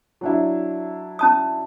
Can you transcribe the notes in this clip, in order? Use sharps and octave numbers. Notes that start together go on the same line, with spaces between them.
F#3 D4 E4
C#4 A5 D#6